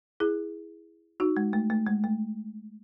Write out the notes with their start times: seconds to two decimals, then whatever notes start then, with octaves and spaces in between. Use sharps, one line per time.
0.20 E4 G#4
1.20 D#4 F#4
1.37 G#3
1.53 A3
1.70 A3
1.87 G#3
2.04 A3